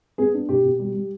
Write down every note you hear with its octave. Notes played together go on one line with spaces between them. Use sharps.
B3 G#4
D4
B2 G4
B2
G3
G3